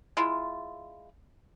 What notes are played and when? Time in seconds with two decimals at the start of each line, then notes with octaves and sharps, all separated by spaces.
0.17 G#3 E4 F4